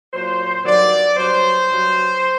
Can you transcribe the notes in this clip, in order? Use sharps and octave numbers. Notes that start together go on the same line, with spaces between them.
A#2 F#3 C5
G2 D#3 F#3 D5
G2 F#3 C5
G2 F#3